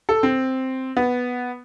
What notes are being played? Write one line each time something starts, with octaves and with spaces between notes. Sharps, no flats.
A4
C4
B3